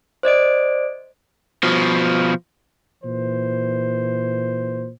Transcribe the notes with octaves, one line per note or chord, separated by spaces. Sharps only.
C5 D5 D#5 D7
B2 F3
A#2 E3 C5